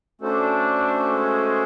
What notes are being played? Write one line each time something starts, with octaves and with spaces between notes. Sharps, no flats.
A3 C#4 D4 F#4 A4 C5
G#3